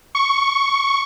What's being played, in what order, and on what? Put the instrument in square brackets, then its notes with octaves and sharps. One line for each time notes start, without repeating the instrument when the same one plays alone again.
[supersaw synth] C#6